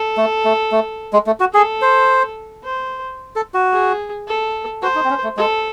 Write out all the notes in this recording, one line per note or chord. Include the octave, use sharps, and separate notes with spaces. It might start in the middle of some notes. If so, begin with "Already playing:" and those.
Already playing: A4
A3
A3
A3
G#3
A3
F#4
G#4 A4
C5
C5
A4
F#4
G#4
A4
F#4 C5
D#4
C4
C#4
A3
G#3 A4